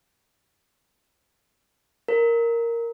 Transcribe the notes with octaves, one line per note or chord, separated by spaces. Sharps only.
A#4